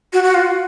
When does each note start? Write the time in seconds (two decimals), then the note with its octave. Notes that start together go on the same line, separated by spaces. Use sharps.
0.13 F#4
0.24 F#4
0.34 F4